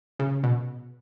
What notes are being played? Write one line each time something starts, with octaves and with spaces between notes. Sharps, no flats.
C#3
B2